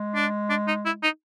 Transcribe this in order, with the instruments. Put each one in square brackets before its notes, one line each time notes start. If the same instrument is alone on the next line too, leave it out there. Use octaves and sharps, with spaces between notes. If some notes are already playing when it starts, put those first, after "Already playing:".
Already playing: [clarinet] G#3
[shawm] D4
D4
D#4
E4
D#4